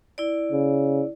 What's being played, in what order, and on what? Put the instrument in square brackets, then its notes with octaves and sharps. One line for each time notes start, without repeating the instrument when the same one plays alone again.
[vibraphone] E4 D5
[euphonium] C#3